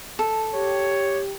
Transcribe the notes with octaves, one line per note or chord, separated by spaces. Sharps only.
A4
G4 C#5